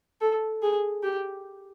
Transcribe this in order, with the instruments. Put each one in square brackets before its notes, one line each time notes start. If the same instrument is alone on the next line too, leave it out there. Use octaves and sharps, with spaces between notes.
[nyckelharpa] A4
G#4
G4